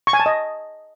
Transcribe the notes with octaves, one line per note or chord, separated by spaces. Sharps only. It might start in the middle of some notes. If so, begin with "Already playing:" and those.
C#6
G#5
A5
D#5